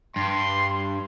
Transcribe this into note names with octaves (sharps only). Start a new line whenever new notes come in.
G2 C6